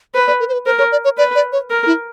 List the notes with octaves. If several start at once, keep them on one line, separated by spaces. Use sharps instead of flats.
B4 C5
D5
A#4
C5
B4
A#4 C5
C#5
D5
C#5
B4 D5
D5
C#5
A#4
E4